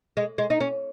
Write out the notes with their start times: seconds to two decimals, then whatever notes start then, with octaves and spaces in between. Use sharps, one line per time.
0.17 G#3
0.38 G#3
0.50 D#4
0.60 C#4